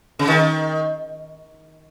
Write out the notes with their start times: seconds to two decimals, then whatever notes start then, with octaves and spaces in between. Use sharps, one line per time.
0.19 C#3
0.28 D#3